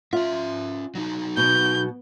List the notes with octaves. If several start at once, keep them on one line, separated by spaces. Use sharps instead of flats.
C#4 F4 E5
F#3 D#4
B2 G6